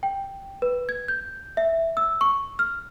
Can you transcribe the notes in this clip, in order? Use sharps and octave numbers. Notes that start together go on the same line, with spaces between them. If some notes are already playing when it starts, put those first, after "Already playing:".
G5
B4
G#6
G6
E5
E6
C#6
F6